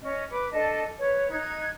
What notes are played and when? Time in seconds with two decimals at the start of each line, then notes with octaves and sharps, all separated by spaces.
0.02 C#4 D#5
0.30 B4 B5 D6
0.52 D4 A4 D#5 A5
0.98 B4 C#5
1.30 D#4 F#6 G#6